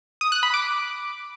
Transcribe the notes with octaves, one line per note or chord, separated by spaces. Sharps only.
D#6
F#6
B5
D6